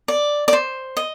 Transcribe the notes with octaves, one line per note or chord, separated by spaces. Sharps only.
D5
D5
C5
D#5